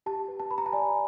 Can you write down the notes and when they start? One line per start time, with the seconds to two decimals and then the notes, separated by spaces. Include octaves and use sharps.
0.06 G4 A5
0.28 B4
0.40 A5
0.51 B4 B5
0.58 A#5
0.66 A5
0.73 D5 G#5